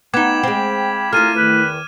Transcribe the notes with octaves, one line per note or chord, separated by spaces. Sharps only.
B3 D#4 F5 G5 B5 D6 G#6 E7
G#3 C4
D#2 A3 E4 F4 G#5 A#5 F6 D#7
E2 D#3 B4